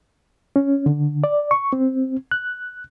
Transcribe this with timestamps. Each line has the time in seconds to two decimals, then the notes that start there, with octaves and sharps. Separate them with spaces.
0.56 C#4
0.86 D3
1.24 D5
1.51 C#6
1.73 C4
2.31 F#6